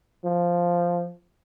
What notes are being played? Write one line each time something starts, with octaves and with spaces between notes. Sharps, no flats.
F3